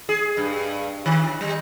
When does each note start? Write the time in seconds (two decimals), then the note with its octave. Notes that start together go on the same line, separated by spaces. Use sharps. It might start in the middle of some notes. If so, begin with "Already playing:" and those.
0.09 G#4
0.37 G2
1.06 D#3
1.41 G3